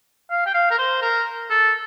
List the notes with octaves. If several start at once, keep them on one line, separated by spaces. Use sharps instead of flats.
F5
G5
F5
A#4
C5
A#4
A4